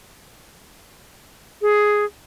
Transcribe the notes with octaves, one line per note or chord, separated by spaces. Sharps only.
G#4